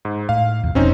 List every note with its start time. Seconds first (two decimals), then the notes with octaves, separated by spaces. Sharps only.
0.05 G#2
0.29 A2 F5
0.64 E2 C3
0.75 F1 F2 B2 C4 C#4 D#4